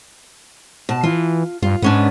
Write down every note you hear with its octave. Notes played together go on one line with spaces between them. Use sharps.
B2 A5
E3 F4
G2 F4
G#2 B3 C#4 D4